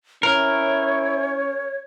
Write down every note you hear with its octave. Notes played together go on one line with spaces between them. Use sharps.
C#4 E4 A#4 C#5